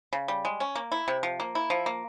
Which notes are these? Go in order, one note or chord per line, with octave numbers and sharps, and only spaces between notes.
C#3
G3
G#3
C#4
A#3
E4
C3
F3
A#3
E4
F3
A#3